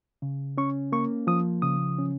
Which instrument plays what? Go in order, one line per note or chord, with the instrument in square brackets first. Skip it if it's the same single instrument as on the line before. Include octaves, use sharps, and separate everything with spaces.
[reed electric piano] C#3
C#4 C#6
A#3 C#6
F3 D#6
C#3 D#6
C#4